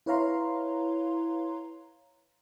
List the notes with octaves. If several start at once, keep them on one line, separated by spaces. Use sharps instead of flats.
E4 B4 C#5 F5 A#5 C6